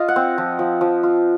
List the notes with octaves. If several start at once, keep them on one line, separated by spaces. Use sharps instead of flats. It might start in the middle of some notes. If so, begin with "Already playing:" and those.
Already playing: F4 D#5
F#5
C4
F3
F3
F3
F4